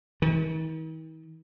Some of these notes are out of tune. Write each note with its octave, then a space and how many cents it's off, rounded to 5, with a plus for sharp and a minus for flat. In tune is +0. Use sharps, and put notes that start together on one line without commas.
D#3 +45